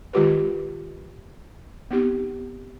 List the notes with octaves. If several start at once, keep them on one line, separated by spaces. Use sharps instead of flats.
D#3 G#3 F4 G4 A#4 B4
B3 C4 D#4 G4